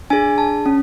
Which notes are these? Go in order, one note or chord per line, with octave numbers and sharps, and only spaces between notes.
D4 G#4 G#5
A5
C#4